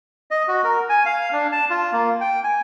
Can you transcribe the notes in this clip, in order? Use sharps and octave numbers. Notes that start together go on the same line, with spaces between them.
D#5
F#4
A#4
G#5
F5
D4
A5
F4
A#3
G5
G#5